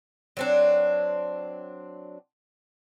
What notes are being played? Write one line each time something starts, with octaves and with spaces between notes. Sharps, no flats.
F#3 C4 D4